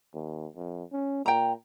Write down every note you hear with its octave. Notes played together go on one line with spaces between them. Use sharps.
D#2
F2
C#4
A#2 G5 A#5